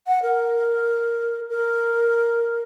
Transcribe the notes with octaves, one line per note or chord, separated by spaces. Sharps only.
F#5
A#4
A#4